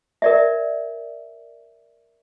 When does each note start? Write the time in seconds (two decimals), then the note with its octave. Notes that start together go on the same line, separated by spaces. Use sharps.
0.22 A#4 D5 E5